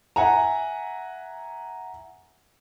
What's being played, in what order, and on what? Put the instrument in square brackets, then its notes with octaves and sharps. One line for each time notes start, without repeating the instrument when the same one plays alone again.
[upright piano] E5 F#5 G#5 A#5